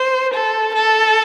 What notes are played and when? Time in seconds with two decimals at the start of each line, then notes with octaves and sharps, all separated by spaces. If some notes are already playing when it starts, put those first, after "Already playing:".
Already playing: C5
0.34 A4
0.75 A4